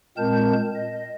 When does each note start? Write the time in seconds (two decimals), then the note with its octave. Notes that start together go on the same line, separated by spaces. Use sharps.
0.17 A#2 G#3 C4 A#4 A5 G6
0.76 D#5